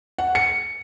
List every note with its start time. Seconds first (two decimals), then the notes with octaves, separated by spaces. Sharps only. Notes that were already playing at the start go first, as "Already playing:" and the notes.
0.18 F#5
0.35 C#7